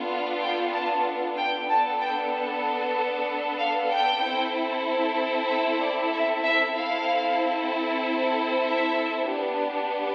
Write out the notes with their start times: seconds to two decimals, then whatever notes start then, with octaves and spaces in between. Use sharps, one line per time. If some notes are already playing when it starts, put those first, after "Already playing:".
Already playing: B3 D4 F4 A4
0.10 F5
0.42 G5
0.74 A5
1.37 G5
1.68 B3 D4 A4 A5
2.00 G5
3.59 F5
3.90 G5
4.22 C4 E4 A4
5.48 E5
5.81 D5
6.12 E5
6.44 E5
6.75 C4 E4 A4 F5
8.66 E5
9.29 B3 D4 G4